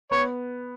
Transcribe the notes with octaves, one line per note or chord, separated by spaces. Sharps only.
B3 C#5